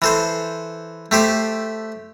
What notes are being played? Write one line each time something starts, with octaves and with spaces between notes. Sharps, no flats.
E3 A4 C5
A3 G4 C5